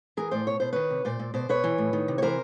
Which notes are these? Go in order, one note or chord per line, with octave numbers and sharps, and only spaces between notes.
E3 G#4 A#4
A2 C5 D5
B2 C#5
B2 C5
D#3 B4 C#5
C3
A#2 C5 D5
A#2
B2 C5 D5
B2 B4 C#5
E3
A2
D#3
C3
C#5
E3 A#4 C5